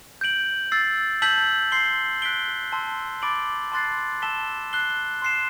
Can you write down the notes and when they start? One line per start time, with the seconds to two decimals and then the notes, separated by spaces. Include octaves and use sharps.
0.21 G6 D7 F#7
0.72 E6 A6 C7
1.22 A5 E6 G6 B6 F#7
1.72 C6 G6 C7 G7
2.22 F#6 B6 D7 G7
2.72 A5 C6 E6
3.22 B5 D6 A6 D7 F#7
3.72 A5 C6 F#6 A6 C7
4.22 A5 E6 B6 E7 G7
4.73 F#6 C7 G7
5.22 C6 F#6 C7 E7